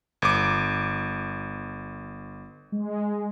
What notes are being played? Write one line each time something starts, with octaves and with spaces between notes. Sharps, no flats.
G1 D6
G#3